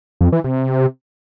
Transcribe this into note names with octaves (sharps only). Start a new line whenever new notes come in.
F2
E3
C3